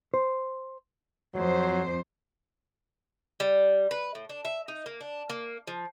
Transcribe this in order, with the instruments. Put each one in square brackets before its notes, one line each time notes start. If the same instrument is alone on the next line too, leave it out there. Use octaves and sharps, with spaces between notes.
[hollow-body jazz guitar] C5
[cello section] F2 C5 [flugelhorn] F#3
[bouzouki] G3
B4
A2
D4
E5
D#4
A#3
D4
A#3
F3